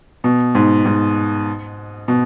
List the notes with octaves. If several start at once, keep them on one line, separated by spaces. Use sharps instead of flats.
B2
G#2
G#2
B2